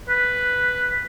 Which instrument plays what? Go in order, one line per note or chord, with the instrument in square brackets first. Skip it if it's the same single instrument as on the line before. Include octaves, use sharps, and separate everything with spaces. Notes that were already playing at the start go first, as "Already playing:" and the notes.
[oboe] B4